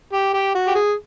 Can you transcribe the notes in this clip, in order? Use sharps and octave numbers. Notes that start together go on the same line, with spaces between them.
G4
G4
F#4
G4
G#4